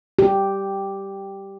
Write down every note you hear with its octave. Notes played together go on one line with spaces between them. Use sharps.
G4